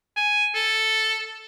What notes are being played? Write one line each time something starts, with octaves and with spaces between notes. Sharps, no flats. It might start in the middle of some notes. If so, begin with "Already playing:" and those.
G#5
A4